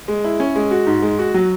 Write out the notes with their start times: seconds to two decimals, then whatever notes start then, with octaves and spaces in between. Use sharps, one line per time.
0.08 G#3
0.24 E4
0.40 C#4
0.55 G#3
0.71 F#4
0.87 G#2
1.02 G#3
1.19 F#4
1.34 F#3